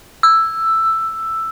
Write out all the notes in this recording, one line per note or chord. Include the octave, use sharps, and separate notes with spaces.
E6